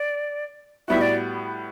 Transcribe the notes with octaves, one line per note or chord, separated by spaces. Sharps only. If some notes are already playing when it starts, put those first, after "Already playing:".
Already playing: D5
A2 G3 B3 F#4 E5
D5